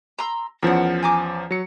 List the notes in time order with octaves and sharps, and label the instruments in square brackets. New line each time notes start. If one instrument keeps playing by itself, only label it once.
[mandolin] A#5 C6 E6
[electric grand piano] E2 F3 C#4 [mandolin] A#4 F#5
[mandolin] G#5 A#5 D6
[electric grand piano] F#3 C#7